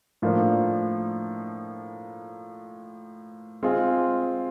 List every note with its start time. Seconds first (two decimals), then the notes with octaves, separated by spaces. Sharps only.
0.22 A2 F3 A#3 D4
3.63 G#3 C4 F4 G#4